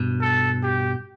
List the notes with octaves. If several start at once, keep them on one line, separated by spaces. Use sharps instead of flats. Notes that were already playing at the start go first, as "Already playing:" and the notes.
Already playing: G2 B2
A4
G4